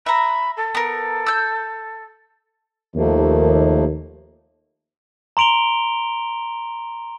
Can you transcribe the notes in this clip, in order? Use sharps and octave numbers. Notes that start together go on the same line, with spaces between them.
E5 A#5 B5
A4
B3 A#4
E6 G6
D#2 F3 A3 A#3
A#5 C6 D7 F7 G7